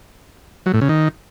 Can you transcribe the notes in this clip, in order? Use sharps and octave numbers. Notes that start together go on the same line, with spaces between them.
F#3
A2
C#3
D#3